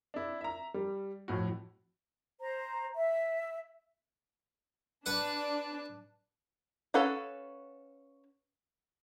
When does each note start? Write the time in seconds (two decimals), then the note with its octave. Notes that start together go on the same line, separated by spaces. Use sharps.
0.14 D4 E4
0.41 E5 A#5
0.74 G3
1.28 F2 A2 F#4
2.41 C5 A#5
2.96 E5
5.06 D4 B4 F#5
6.94 C#4 A4 B4 F5 F#5